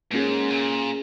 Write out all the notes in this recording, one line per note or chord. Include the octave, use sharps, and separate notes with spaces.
G#2 A#3 C#4 G#4 C#5
A#2